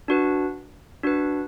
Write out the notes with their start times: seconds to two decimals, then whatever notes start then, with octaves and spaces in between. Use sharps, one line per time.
0.08 D4 F#4 B4
1.03 D4 F#4 B4